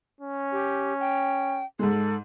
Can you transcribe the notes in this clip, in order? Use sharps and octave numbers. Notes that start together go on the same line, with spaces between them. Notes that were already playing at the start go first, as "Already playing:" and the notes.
C#4
G4
G5
G#2 G#3 A4